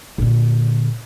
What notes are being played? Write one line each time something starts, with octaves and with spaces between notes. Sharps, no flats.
A#2 D3